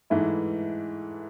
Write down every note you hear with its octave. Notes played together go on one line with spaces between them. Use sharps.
G#2 E3 A3 E4